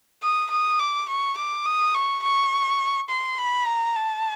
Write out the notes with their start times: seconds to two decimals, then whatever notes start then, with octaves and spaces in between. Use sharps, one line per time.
0.23 D#6
0.50 D#6
0.79 D6
1.09 C#6
1.37 D6
1.66 D#6
1.95 C#6
2.23 C#6
3.09 C6
3.38 B5
3.67 A#5
3.96 A5